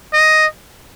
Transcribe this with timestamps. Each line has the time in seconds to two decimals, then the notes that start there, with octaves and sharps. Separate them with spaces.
0.13 D#5